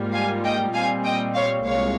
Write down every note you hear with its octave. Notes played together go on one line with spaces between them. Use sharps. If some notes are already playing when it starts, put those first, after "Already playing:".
Already playing: G#2 G3 A#3 F4
F5 G#5
D#5 G5
A#2 G3 C4 F5 G#5
D#5 G5
C#5 F5
C2 A#2 G#3 C#5 F5